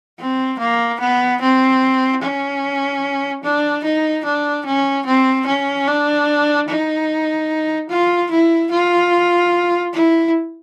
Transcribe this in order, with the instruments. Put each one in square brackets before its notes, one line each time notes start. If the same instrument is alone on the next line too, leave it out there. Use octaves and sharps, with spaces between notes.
[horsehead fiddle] C4
A#3
B3
C4
C#4
D4
D#4
D4
C#4
C4
C#4
D4
D#4
F4
E4
F4
E4